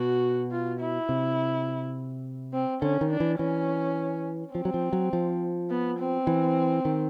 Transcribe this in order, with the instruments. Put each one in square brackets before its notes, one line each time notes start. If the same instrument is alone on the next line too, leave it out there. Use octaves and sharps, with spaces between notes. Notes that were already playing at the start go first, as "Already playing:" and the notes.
Already playing: [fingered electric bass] B2 [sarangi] F#4
[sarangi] F4
E4
[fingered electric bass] C3
[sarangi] C4
[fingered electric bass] D3 [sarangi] C#4
[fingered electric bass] D#3
[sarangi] D4
[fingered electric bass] E3
[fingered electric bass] E3 [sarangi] C#4
[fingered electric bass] F3 [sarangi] C4
[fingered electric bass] F#3
F3
F#3
F3
[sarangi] B3
C4
[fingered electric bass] E3
D#3